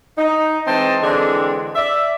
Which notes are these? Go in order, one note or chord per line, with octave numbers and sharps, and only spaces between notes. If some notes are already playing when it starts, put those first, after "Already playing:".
D#4
E3 G#3 C4 D#5 A5
D3 E3 G#3 C4 D4
D5 E5